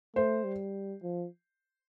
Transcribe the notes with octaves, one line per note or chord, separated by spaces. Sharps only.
A3 C5
G3
F3